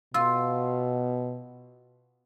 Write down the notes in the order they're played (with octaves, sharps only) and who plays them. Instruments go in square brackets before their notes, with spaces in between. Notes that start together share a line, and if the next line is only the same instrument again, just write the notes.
[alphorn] B2 [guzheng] F4 [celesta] E6